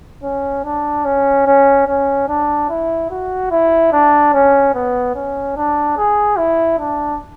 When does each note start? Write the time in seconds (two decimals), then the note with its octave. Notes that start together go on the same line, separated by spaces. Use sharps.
0.23 C#4
0.65 D4
1.05 C#4
1.47 C#4
1.87 C#4
2.29 D4
2.69 E4
3.11 F#4
3.51 E4
3.92 D4
4.34 C#4
4.74 B3
5.15 C#4
5.56 D4
5.97 G#4
6.38 E4
6.79 D4